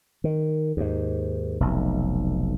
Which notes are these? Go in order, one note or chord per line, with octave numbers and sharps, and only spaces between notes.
D#3
D#2 G#2
F1 B1